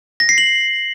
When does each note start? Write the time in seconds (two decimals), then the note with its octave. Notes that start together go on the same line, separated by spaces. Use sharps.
0.20 A#6
0.29 C7
0.38 F#7